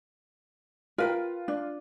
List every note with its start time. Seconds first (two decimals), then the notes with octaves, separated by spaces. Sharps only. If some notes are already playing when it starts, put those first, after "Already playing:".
0.98 F4 A#4 B4 G5
1.48 D4